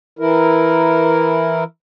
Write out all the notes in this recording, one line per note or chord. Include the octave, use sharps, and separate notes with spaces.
E3 E4 A#4